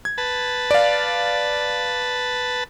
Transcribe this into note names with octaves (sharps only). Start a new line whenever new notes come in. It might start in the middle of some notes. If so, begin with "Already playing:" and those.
G#6
B4 A5
D5 F5